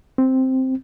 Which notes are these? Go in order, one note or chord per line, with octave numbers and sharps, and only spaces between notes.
C4